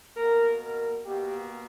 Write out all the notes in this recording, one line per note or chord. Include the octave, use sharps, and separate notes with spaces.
B2 A#3 A#4
A#4
B2 A#3 G4